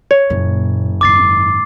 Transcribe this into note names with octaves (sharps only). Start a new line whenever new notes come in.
C#5
F#1 A#2
G#2 D#3 D6 A6 C7